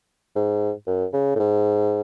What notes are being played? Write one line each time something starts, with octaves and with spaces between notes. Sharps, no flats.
G#2
F#2
C#3
A2
G#2